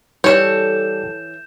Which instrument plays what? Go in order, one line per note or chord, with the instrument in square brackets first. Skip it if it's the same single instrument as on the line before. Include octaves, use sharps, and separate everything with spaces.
[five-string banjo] E3 F3 C#5 [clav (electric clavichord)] G3 [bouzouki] A4 [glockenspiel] G6 E7